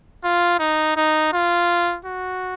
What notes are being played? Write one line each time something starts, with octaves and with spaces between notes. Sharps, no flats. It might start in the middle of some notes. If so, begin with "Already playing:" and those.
F4
D#4
D#4
F4
F#4